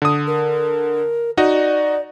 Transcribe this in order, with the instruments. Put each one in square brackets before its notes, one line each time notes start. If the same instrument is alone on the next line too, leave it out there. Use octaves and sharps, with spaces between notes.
[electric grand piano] D3 D#6
[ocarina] A#4
[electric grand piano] D#4 F#4 D#5 [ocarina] D5